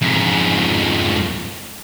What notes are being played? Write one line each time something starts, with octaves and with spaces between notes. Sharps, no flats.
F2 G#2